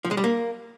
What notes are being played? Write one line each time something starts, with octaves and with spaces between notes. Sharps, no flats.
F3
G#3
G3
A#3